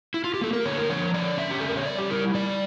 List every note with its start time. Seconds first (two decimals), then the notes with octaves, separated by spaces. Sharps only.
0.14 E4
0.24 F4
0.34 G4
0.41 A#3 A4
0.53 A#4
0.65 D3 C#5
0.77 A#4
0.90 F3 C#5
1.14 D3 D5
1.37 C#4 E5
1.51 G4
1.60 C#3 A4
1.68 A#4
1.77 C#5
1.86 G3 D5
1.98 G4
2.10 E4 A#4
2.34 G3 D5